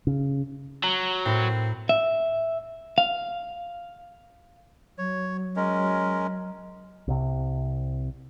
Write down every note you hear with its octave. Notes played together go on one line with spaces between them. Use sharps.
C#3
F#3 A#5
A2 C4 E4 A#4
E5
F5
F#3 C#5
G#3 C#4 A#4
C2 C3